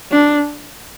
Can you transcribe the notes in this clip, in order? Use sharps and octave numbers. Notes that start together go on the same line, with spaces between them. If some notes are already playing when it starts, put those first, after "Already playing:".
D4